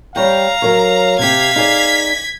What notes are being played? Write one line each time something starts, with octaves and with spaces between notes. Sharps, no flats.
G3 C#5 F5 G5 A#5
F#3 A#4 C#5
C3 G4 G#6 B6
D#4 G#4 D5